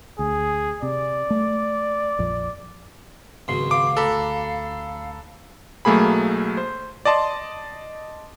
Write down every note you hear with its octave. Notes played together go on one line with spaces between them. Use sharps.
D2 G#4
C3 D5
A3
A#1 F2 F3
G#1 C#2 B2 F#3 C6
F5 D6
D2 D4 A4 A#5 B5
B1 F#3 A3 A#3 G#4 B5
C5
D5 D#5 A5 C6